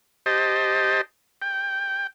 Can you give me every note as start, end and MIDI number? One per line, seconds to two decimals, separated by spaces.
0.26 1.01 67
0.26 1.01 72
0.26 1.01 75
0.26 1.01 81
1.42 2.07 79